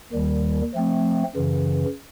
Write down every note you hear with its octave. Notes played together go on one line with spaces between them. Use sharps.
D#2 D#3 G3
F3 A3 C4
F#2 C#3 E3